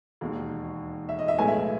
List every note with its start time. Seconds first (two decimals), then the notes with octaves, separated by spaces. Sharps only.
0.21 E1 D#2 D#3
1.09 E5
1.19 D#5
1.28 E5
1.38 B1 A2 G#3 B3 G#5
1.48 E5